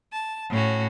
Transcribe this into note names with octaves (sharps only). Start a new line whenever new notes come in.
A5
A2 C#4 F#4